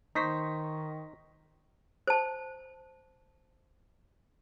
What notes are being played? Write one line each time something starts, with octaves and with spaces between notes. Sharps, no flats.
D#3 D#4 C5 C#6 A#6 B6
C5 A5